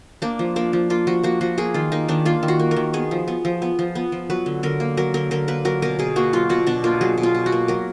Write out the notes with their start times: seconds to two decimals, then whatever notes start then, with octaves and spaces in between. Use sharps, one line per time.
0.22 A#3 D4
0.39 F3
0.56 A#3 D4
0.73 F3
0.90 A#3 F4
1.07 F3 F#4
1.23 A#3 F#4
1.41 F3 F#4
1.58 A#3 G#4
1.74 D#3 F4
1.92 A#3 D#4
2.08 D#3 D4
2.25 A#3 F4
2.43 D#3
2.48 F#4
2.60 A#3
2.71 A#4
2.76 D#3
2.93 B3 G#4
3.11 F3
3.28 B3
3.45 F3
3.62 B3
3.79 F3
3.95 B3
4.12 F3
4.30 F#3 B4
4.46 D3
4.63 D3 A#4
4.80 A#3
4.97 F#3 A#4
5.14 D3 A#4
5.31 D3 A#4
5.48 A#3 B4
5.65 F#3 A#4
5.82 B2 A#4
5.99 B2 G#4
6.16 A#3 F#4
6.33 F#3 F4
6.49 B2 F#4
6.67 B2 D4
6.84 A#3 F4
7.01 F#3 G#4
7.18 B2
7.23 F4
7.35 B2
7.46 F#4
7.52 A#3
7.68 F#3 A#4